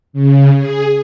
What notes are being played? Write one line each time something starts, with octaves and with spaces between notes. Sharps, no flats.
C#3
G#4